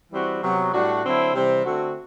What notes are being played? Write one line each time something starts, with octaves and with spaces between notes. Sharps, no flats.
E3 G3 C4 F#4
C3 F#3 B3 F#4
A2 G3 D4 F#4
D3 F#3 C4 E4
C3 E3 G3 C4
D3 A3 C4 F#4